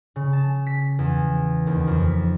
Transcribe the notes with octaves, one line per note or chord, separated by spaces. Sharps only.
C#3
A5
B6
E2
D#2
F2
B6